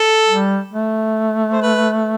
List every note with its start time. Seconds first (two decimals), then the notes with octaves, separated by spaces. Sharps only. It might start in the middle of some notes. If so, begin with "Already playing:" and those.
Already playing: A4
0.28 G3
0.73 A3
1.52 C5
1.62 B4